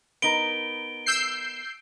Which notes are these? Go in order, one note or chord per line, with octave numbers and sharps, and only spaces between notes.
B3 D#4 A#4 D7 G7
E6 G6 C7